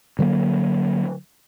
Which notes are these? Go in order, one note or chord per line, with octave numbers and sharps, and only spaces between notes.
D3 F#3 G3 A#3